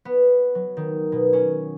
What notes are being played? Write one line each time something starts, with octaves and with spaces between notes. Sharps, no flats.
B3
F#3
D#3
B2
C#4